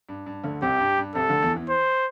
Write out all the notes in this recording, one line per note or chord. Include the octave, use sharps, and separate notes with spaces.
G2
G2
D2 D3
C2 C3 G4
G2
G2
C2 C3 A4
D2 D3
E2 E3
E2 E3
C5